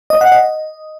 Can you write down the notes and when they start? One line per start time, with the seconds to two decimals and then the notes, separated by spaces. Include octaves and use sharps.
0.10 D#5
0.21 F#5
0.32 D#5